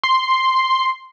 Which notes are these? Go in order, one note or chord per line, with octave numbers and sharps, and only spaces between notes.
C6